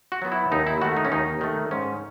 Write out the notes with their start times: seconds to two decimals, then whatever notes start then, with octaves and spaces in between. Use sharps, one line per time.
0.12 F#4
0.22 F#3 B3
0.32 E4
0.52 D#2 D#4
0.67 E4
0.82 D#3 A3 F#4
0.97 D#4
1.05 C#4
1.12 D#2 D#4
1.41 D#3 A3
1.71 G#2 C#4